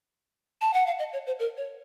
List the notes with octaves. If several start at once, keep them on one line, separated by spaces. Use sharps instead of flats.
A5
F#5
F5
D#5
C#5
C5
A#4
C#5